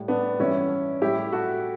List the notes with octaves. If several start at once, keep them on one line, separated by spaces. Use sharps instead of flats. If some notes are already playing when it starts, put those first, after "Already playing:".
Already playing: A2 G3
B3 D4
G2 E3 G3 C#4 E4
A2 G3 E4 G4
F#4 A4